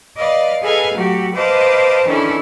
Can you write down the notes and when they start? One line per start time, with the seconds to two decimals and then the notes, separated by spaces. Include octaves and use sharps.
0.17 B4 D5 D#5 F5
0.62 G#4 A4 B4 D#5 F5 G#5
0.94 F#3 A3 F#4 G4
1.35 B4 C5 D#5 F5 A5 D6
2.06 D#3 E3 C#4 D4 E4 A4